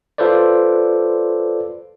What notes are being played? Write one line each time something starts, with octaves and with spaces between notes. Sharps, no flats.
F4 A4 B4 C5 D5